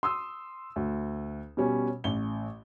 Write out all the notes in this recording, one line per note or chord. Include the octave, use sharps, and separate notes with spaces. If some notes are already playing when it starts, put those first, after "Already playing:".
C6 D#6 E6
D2
B2 G3 C#4
A1 G7